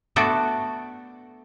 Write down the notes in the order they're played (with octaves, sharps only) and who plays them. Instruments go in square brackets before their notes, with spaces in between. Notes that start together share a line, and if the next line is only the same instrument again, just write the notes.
[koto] A3 B3 D4 F#4 A4 D5